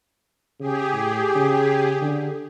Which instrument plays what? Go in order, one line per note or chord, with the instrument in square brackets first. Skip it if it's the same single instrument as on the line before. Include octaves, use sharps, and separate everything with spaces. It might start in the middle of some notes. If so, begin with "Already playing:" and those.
[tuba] C#3 [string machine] G4 G#4
[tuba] A2
C#3
D3